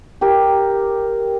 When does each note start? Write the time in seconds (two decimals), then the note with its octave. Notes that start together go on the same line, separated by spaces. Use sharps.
0.21 G4 A#4